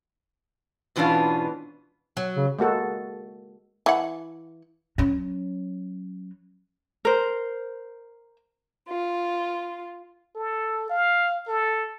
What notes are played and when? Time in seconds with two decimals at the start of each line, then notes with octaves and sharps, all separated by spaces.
0.96 G#2 B2 E3 C#4 D4 F4
2.17 F#3
2.36 C#3
2.59 G#3 A#3 F#4 A4
3.86 E3 F#5
4.98 F#3 C#4
7.05 A#4 C5
8.89 F4
10.35 A4
10.90 F5
11.47 A4